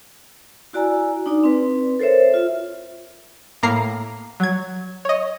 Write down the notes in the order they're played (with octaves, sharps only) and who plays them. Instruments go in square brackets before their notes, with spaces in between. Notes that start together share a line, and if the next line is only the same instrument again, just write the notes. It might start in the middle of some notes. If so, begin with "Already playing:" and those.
[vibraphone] E4 F#4 D5 G#5 A#5
D4 D#4 D5
C4 B4
A4 A#4 C5 C#5 E5
F4 E5
[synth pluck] A2 A#3 A#5 C7
F#3 G#6
C#5 D#5